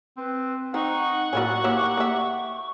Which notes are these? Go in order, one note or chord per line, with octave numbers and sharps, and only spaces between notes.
C4 B4
C4 D#4 F#5 C#6
A2 F#3 A#3 C#4
A#3 E4 G4 C#5
A#3 E5